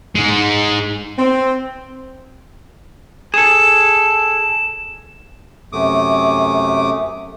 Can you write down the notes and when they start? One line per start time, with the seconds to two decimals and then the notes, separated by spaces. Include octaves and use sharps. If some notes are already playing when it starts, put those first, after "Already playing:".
0.15 G#2 G#3
1.18 C4
3.34 G#4 A4 E7
5.73 F#2 C3 A3 D6 D#6